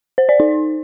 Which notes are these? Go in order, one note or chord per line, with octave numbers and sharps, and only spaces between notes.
C5
D5
D#4